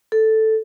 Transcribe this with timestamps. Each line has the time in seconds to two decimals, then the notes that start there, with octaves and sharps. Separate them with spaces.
0.12 A4